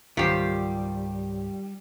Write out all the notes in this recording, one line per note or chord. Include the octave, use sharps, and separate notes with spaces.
C#2 G#2 D#3 F#3 G3 F4 G4 C5